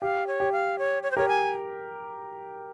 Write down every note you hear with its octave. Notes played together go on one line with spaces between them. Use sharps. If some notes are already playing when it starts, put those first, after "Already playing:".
G4 F5
C#5
G4
F5
C#5
C#5
C5
G4 A#4 C#5
G#5